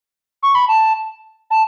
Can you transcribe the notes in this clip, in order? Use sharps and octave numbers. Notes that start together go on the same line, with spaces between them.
C#6
B5
A5
A5